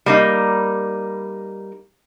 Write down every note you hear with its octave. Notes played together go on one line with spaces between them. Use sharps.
G3 A#3 D#4